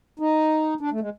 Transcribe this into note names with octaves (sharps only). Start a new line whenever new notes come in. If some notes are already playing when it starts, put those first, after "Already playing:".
D#4
D4
A3
G#3